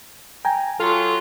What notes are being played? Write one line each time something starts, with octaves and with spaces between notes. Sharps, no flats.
G5 G#5 A#5
F#3 F4 A4